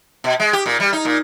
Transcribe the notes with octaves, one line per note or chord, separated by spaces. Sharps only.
B2
G#3
G4
A#2
G3
D#4
A#2